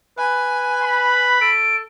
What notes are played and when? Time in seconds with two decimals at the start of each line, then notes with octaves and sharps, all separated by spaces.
0.18 B4 G#5
0.83 B5
1.41 A4 D7